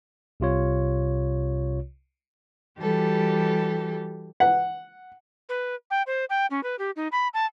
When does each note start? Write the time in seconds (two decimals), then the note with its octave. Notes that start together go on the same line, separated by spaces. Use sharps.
0.40 C2 C3 F4 C#5
2.79 E3 G3 F#4 G4 A4
4.40 F#5
5.49 B4
5.91 G5
6.07 C5
6.30 G5
6.50 C#4
6.63 B4
6.79 G4
6.96 D#4
7.12 B5
7.34 A5